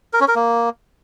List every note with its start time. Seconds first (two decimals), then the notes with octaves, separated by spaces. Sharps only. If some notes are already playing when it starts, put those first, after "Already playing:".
0.13 A#4
0.21 C#4
0.28 A#4
0.35 A#3